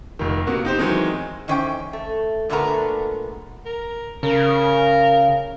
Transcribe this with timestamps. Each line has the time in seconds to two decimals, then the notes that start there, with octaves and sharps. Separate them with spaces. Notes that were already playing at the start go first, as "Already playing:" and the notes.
0.19 F1 D#3
0.47 C3 A#3 B3 F#4
0.65 D#4 G4 C5
0.79 D#3 E3 F#3 G#3 C4 D#4
1.48 D#3 E3 C#4 C5 D5 G5
1.93 A3
2.50 A#2 D3 G#3 A3 B3 A#4
3.66 A#4
4.23 C#3 A#4